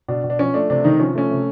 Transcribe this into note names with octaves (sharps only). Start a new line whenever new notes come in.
B2 D4
B2
D4
F3 C#4
A3 D4
C3 D4
C3 D#3 D#4
F3 C#4
A3 C#4
C3